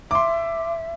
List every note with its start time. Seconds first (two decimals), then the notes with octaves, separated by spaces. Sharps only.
0.11 E5 C6 D6